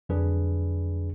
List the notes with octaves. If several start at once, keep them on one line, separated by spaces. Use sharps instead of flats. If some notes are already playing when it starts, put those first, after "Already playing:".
F2 D3 F#3 D4 G#4 B4